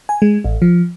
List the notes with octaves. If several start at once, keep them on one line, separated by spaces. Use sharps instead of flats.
G#5
G#3
A1
F3